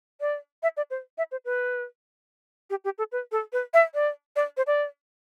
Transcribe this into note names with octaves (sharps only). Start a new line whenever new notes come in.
D5
E5
D5
C5
E5
C5
B4
G4
G4
A4
B4
A4
B4
E5
D5
D5
C5
D5